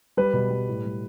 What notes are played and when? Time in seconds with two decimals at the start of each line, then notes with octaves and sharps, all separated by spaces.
0.17 G3 B4
0.34 B2
0.51 G3
0.68 A2
0.85 G3